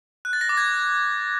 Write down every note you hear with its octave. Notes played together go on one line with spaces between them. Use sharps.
F#6
A6
A#6
D6
G#6